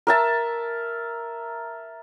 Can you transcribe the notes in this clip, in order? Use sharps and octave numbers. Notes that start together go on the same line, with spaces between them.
A#4 E5 A5